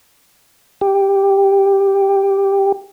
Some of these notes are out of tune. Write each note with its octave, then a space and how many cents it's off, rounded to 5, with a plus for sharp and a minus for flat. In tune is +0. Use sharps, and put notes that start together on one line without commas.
G4 +5